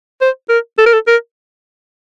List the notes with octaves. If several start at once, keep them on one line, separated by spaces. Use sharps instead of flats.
C5
A#4
A4
A#4
A4
A#4